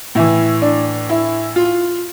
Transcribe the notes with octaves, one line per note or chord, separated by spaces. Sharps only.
A2 E3 E4
D4
E4
F4